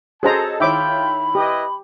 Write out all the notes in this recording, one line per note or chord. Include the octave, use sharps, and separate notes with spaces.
C#4 F#4 G#4 A4 C5 D#5 A5 A#5
D#3 E4 F4 C#5 E5 G5 B5 D6
E4 G4 B4 D#5